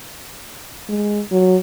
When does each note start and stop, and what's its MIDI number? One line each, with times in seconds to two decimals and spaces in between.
0.89 1.22 56
1.31 1.56 54